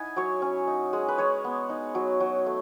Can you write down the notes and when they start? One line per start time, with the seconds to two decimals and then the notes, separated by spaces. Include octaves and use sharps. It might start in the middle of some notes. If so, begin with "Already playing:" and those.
Already playing: D#4 E4 F#5 G#5
0.16 F#3 C#5
0.42 C#4
0.67 D#4
0.93 G#3
1.08 B4
1.18 G#3 C#5
1.44 B3
1.70 D#4
1.95 F#3
2.20 F#3
2.46 A3